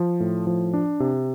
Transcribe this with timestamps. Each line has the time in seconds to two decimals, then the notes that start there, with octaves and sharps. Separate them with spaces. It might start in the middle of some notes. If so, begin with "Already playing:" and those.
Already playing: F3
0.20 A2
0.47 F3
0.74 D4
1.00 C3